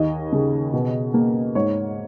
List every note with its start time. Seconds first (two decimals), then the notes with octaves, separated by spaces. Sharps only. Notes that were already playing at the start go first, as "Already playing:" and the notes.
Already playing: D#2 D#5
0.32 C#3
0.73 B2
1.14 A#3
1.55 G#2 C#5